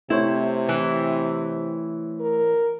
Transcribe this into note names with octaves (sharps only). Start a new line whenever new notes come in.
C3 A3 E4 C5 C#5
E3
A#4